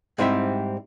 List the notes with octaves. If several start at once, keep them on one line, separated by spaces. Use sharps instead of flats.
G#2 G3 C4 E4 A4 E5